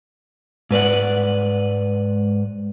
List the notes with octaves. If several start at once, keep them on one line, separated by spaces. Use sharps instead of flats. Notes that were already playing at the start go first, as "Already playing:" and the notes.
G#2 B4 D5 F#5